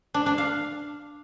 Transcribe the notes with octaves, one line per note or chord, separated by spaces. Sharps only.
D4
D4
F5